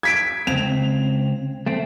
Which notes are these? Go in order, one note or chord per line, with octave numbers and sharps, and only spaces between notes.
G#6 B6 D7
C#2 C4 F7
A3 C4